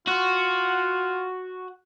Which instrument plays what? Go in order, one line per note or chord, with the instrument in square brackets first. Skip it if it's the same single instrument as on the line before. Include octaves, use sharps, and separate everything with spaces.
[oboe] F4 [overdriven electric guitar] F#4